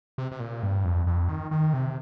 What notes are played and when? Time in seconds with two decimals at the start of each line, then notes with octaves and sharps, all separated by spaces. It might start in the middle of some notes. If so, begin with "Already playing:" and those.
0.18 C3
0.32 C3
0.40 A#2
0.63 G2
0.85 F2
1.07 F2
1.29 D#3
1.51 D#3
1.73 C3